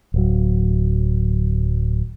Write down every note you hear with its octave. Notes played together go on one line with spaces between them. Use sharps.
D1 F#3